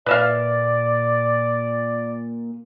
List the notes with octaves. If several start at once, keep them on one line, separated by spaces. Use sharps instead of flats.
A#2 B4 D5 E5 F5